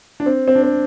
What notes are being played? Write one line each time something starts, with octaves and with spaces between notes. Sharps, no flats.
D4
C4
C4
D4
C4